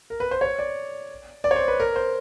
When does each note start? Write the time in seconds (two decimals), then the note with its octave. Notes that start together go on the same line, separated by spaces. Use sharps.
0.10 A#4
0.20 B4
0.31 C5
0.41 C#5
0.59 D5
1.44 D5
1.51 C#5
1.56 C5
1.68 B4
1.80 A#4
1.96 C5